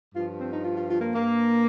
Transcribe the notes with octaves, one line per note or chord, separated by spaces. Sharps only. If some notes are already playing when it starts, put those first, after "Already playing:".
G2 F3 F4
C4
D#4
F4
F4
F4
A#3
G2 G3 A#3